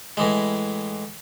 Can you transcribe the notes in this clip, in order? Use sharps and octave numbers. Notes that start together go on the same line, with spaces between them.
A2 E3 G#3